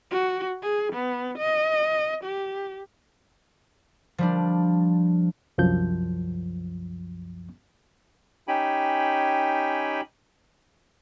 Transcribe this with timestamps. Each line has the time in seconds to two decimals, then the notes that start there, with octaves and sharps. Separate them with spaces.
0.11 F#4
0.63 G#4
0.93 B3
1.39 D#5
2.25 G4
4.18 F3 G3 D4
5.58 C2 F#2 F3 G6
8.48 C#4 D#4 G4 G5 G#5 B5